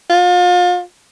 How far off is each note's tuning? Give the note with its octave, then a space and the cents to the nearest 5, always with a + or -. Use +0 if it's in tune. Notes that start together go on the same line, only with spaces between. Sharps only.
F4 +35